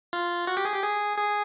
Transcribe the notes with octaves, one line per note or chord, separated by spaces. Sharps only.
F4
F#4
G4
G#4
G4
G#4
G#4